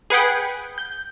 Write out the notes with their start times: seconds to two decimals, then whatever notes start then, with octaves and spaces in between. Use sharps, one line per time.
0.10 G#4 B4 F#5 G5
0.78 G6